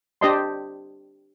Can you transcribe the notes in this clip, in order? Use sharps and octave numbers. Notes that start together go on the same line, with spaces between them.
D4 G4 C5 D#5 A5 C6